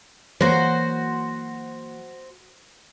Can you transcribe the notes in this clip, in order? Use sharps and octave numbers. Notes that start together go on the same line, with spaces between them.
E3 F#3 A#3 F#4 C5